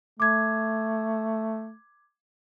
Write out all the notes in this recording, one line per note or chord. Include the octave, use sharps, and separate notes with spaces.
A3 D6 G#6